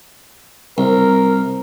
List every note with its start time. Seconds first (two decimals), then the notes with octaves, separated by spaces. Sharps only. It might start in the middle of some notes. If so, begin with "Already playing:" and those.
0.78 C2 A#4